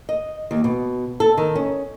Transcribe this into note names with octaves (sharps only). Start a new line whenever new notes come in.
D#5
D#2
B2
A4
D#3
C#4